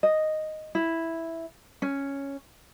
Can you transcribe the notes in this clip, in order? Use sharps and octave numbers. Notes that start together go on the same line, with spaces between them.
D#5
E4
C#4